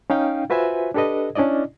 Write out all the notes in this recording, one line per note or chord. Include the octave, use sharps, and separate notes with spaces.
C#4 D#4 F5 G5
F4 F#4 B4 C5 E5 G#5
D4 G4 A4 B4 D#5
C#4 D4 E4 D5 D#5